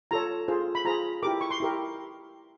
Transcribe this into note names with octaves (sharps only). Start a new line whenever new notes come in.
F4 A4 C#5 A#5
F4 G#4 C5
B5
F4 G#4 C5 A#5
E4 G4 A#4 D6
C#6
C6
E4 G4 A#4